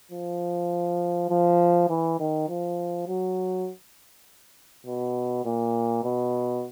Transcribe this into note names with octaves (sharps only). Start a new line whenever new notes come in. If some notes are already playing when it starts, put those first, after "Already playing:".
F3
F3
E3
D#3
F3
F#3
B2
A#2
B2